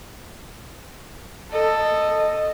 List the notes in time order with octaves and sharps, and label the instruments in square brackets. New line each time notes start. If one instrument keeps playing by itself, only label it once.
[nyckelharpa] A4 [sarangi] D#5